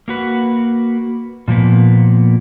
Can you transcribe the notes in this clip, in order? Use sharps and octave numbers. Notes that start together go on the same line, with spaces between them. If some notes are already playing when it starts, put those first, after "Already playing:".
A#3 F#4 B4
A#2 F3 A#3 B3